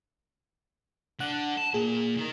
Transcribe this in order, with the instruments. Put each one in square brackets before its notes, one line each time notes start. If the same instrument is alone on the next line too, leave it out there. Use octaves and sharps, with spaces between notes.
[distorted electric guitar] D3 [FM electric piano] F#5
[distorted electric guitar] A5
[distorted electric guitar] A#2 A#3 [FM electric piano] G#4
[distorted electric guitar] D#3 A#4